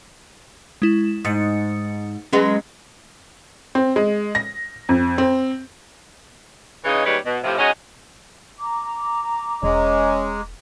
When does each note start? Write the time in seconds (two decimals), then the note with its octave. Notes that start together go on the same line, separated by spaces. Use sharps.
0.82 G#3 E4 E7
1.25 G#2 D#6 A6 C#7
2.33 F#3 G#3 B3 C#4
3.75 C4
3.96 G#3
4.35 A#6
4.89 F2
5.18 C4
6.84 C#3 E3 G#3 D#4 F4 C#5
7.05 D#2 G3 G#3 B4 C#5
7.24 B2
7.43 A2 C3 F3
7.58 G#3 C#4 D#4 F#4 G#4 D#5
8.59 A#5 D6
9.63 E1 G#3 C#4